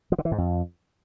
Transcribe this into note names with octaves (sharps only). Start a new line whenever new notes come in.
F3
D3
E3
G#2
F2